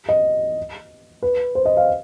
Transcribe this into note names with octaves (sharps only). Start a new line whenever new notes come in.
D#5
B4
C5
D#5
F5